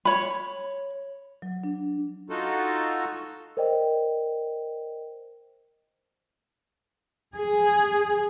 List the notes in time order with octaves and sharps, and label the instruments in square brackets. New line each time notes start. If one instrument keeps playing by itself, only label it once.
[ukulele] C#5 B5
[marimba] F#3
D4
[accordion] D#4 F4 F#4 A4
[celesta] A#4 C5 D5 D#5 G5
[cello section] G#4